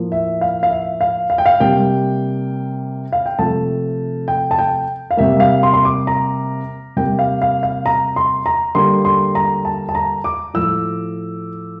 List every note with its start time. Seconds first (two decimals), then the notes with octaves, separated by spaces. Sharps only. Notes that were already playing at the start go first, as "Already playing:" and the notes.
Already playing: A2 F3 A#3
0.12 E5
0.41 F5
0.63 F5
0.70 E5
1.01 F5
1.30 F5
1.38 G5
1.46 F5
1.60 C3 G3 A#3 G5
3.13 F5
3.26 G5
3.39 C3 F3 A3 A5
4.28 G5
4.51 A5
4.58 G5
5.11 F5
5.17 C3 G3 A#3 E5
5.40 F5
5.63 C6
5.74 C6
5.85 D6
6.07 A#5
6.97 C3 G3 A#3 G5
7.19 F5
7.42 F5
7.63 F5
7.86 A#5
8.16 C6
8.46 A#5
8.75 D3 G3 A#3 C6
9.05 C6
9.35 A#5
9.65 A5
9.89 A5
9.95 A#5
10.24 D6
10.54 A2 F3 A3 E6